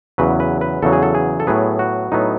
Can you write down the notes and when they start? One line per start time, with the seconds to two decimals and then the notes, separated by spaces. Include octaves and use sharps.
0.18 E2 C#3 F#3 B4
0.40 B4
0.61 B4
0.82 E2 C#3 F#3 A4
0.93 G#4
1.03 A4
1.14 G#4
1.40 A4
1.47 A2 F#3 B3 G#4
1.79 F#4
2.12 A2 F#3 B3 D#4